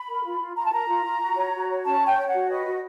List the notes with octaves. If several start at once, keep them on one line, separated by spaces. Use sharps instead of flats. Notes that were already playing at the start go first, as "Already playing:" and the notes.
Already playing: B5
A#4
F4
F4
F4 A#5
A5
A#4 A#5
F4
F4
F#4
C#5
F#4
C#5
C#4 A5
C#5
G5
C#5
F#5
F#4
B4 D#5
F#4